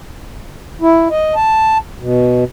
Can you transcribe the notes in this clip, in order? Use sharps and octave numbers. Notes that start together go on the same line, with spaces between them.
E4
D#5
A5
B2